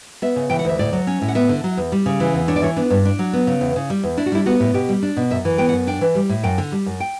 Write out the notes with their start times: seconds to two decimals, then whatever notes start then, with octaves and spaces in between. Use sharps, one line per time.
0.22 B3 E5
0.36 C#3
0.50 E3 G5
0.59 F#5
0.65 D2 E5
0.79 A2 D5
0.93 F#3
1.07 C#4
1.22 A2
1.28 F#5
1.35 B3 E5
1.49 D3
1.64 F#3
1.77 E2
1.92 G3
2.06 C#3
2.20 E3
2.34 E2
2.48 D4 C#5
2.56 D5
2.62 E3 C#5
2.76 B3 D4
2.90 G2
3.05 D4
3.19 F#3
3.33 B3
3.47 C#3
3.61 E2
3.76 C#3
3.90 G3
4.03 E2
4.18 D4 E4
4.26 F#4
4.32 G3 E4
4.46 B3 F#4
4.60 A2
4.74 B2 G4
4.89 G3
5.03 D4
5.17 B2
5.31 F#2 E5
5.45 E3
5.58 B3 G5
5.69 F#5
5.73 F#2
5.87 D4 G5
6.01 E3
6.15 G3
6.29 A2
6.43 F#2 G5
6.58 D3
6.72 G3
6.86 F#2
7.00 G5